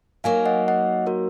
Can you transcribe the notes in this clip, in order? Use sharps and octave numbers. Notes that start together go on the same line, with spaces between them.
F#3 A#3 D#4 F5 G#5
D#5 F#5
D#5 F#5
F#4 A#4